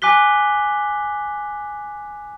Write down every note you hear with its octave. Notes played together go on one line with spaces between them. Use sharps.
G#5 D6 F#6 B6 G7